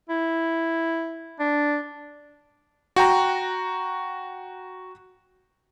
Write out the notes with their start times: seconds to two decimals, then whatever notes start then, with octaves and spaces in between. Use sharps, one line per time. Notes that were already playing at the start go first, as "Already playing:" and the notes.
0.09 E4
1.40 D4
2.96 F#4 G5 A#5